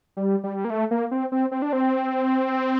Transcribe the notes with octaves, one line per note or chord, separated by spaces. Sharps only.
G3
G3
A#3
A3
A#3
C4
C4
C4
D4
C4